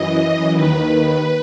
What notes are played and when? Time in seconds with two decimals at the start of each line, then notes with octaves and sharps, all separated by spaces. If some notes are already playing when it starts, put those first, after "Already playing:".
Already playing: F#2 E3 D#5
0.55 D#2 D#3 B4